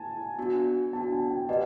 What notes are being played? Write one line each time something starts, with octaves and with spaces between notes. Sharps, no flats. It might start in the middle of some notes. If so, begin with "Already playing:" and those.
Already playing: G#5 A5
B3 D4 F#4
B3 D4 F#4 A5
G#5
G5
G4 B4 D5 D#5 F#5